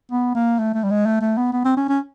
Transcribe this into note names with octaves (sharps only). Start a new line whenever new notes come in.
B3
A#3
A3
A3
G3
G#3
A3
A3
B3
B3
C4
C#4
C#4